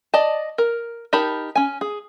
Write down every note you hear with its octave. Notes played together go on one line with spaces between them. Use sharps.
D5 D#5 A5
A#4
D#4 G4 A#4 A5 B5
C#4 G#5
G#4